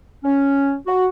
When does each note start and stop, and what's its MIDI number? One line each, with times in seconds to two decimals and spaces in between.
0.24 0.74 61
0.86 1.08 66